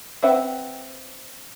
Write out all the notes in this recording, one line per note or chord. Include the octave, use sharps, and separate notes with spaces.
C4 B4 E5 F#5 G5